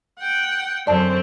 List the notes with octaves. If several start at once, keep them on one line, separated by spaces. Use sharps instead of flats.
F#5 G5
F#2 D3 C4 D5 A5